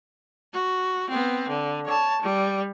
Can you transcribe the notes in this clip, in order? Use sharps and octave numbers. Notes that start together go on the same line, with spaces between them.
F#4
B3 C4
D3
C#5 A5
G3